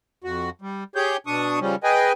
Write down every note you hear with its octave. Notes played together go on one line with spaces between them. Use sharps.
F2 F#4
G3
G4 G#4 C#5 G6
B2 D4 C#6 D#6
C#3 F3 G3 C#4
G#4 B4 D#5 G5 G#5